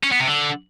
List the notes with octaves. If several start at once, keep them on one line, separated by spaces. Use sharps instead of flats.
C#4
B3
C3
D3